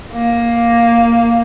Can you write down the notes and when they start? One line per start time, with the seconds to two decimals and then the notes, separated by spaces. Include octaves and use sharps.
0.13 A#3